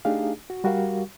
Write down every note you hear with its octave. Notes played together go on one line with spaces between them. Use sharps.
A3 D4 D#4 G4 G#4 F5
F#4
G3 F#4 G4 A#4 F5